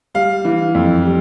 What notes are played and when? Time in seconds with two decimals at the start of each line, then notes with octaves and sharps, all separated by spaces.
0.14 G3 F5
0.45 E3
0.74 F2
1.05 G3